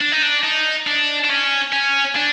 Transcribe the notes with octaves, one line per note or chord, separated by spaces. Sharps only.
D4
D#4
D4
D#4
D4
D4
C#4
C#4
D4